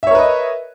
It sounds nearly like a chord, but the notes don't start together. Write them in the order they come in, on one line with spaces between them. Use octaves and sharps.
E5 C#5 A#4 B4 D#5